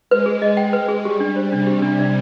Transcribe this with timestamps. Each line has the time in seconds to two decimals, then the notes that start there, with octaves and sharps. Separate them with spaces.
0.10 G#3 B4
0.26 G#4
0.42 D#5
0.57 G5
0.73 B4
0.89 G#4
1.04 G3 G4
1.20 D4
1.36 C5
1.51 C3 D4
1.67 G4
1.82 D4
1.99 D5